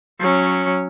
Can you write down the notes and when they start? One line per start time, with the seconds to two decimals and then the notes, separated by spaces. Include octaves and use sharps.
0.19 F#3 C#4